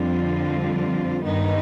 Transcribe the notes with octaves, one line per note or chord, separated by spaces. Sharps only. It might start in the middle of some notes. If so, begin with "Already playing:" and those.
Already playing: F2 D3 G3 C4 F4
G2 D#3 B3 D#4